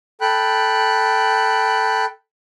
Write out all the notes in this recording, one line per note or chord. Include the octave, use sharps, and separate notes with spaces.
A4 G5 B5 F#6